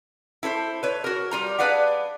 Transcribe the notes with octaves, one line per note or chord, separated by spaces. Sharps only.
E4 A4 B4 C5
B4 C#5
F#4 A#4
G3 F4 A#5
D4 G#4 B4 D5 F5 F#5